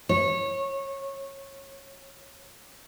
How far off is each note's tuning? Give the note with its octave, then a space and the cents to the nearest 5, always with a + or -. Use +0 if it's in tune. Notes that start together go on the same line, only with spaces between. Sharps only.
C#5 -20